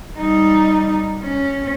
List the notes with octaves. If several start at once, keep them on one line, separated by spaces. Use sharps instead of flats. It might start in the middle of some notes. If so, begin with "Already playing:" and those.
G3 D#4
C#4